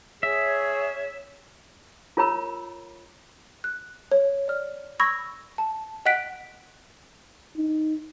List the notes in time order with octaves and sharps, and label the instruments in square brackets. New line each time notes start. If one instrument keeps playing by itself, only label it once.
[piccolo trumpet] G#4 [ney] C#5 [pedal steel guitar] E5
[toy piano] F4 A#4 C#5 A#5 B5 E6
[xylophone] F#6
C#5
D5 F6
B5 C#6 E6 G#6 A#6
A5
D#5 F#5 G5 F#6 B6 D7
[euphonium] D#4